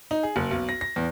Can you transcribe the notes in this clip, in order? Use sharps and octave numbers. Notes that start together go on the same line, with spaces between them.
D#4
G#4
F#1
B1
A#6
A#6
E2